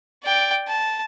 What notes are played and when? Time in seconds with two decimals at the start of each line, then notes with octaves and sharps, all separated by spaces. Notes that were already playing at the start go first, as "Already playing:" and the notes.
0.24 D5 G5
0.67 A5